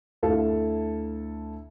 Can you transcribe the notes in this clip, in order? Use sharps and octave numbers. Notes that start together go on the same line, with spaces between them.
D2 E4 A4 F5